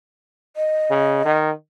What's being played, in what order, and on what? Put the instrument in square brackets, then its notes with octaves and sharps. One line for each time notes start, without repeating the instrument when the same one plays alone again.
[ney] D#5
[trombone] C#3
D#3